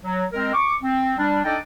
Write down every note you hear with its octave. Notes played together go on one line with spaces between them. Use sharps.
F#3
G#3 C4 A#4
C#6 D6
C4
G3 D4
D4 D#4 A4 D5 D#5 G5